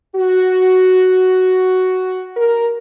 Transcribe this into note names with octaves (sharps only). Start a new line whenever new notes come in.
F#4
A#4